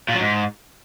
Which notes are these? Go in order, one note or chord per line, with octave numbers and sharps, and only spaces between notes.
A#2
F#3
G#2